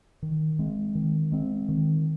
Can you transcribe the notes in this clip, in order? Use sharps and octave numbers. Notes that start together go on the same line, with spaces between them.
D#3
G#3 C4
D#3
G#3 C4
D#3